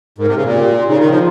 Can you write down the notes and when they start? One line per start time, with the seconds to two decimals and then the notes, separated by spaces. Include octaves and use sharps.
0.18 G#2 A#4
0.27 C3
0.36 C#3
0.45 A#2
0.53 G4
0.70 F4
0.87 C#3 D#4
0.99 D#3 D#4
1.11 F3 F4